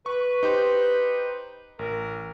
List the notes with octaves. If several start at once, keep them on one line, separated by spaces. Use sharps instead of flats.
B4 C#6
D#4 G4 C5
A1 A#4